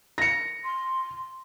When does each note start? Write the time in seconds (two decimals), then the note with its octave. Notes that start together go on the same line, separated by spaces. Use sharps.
0.18 A#6 C#7
0.64 C6